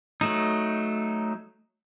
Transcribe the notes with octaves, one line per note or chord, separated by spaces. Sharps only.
F#3 A3 D#4